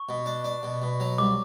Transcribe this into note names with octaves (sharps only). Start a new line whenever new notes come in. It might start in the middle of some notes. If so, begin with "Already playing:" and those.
Already playing: C#6
B2
D4
D4
B2
B2
F#3
C2 D6